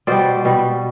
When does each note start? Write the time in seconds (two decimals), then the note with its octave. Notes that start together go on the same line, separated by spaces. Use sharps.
0.07 B2 G3 C5 D5
0.45 B2 G3